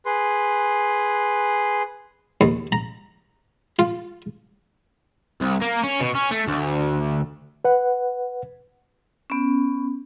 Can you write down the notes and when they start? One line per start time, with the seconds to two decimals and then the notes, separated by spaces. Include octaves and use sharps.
0.06 G#4 B4 C6
2.41 D#2
2.72 A#5
3.79 F4
5.41 C2
5.62 A#3
5.83 C#4
6.00 B2
6.15 C#4
6.31 A3
6.47 D2
7.65 B4 F#5
9.30 B3 C#4